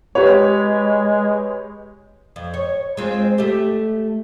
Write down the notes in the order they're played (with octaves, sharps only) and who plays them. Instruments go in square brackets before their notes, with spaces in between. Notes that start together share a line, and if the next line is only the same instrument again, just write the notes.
[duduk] G#3 [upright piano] G4 B4 C#5
[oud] F2
C#5
G#3 C4 F4
A3 G4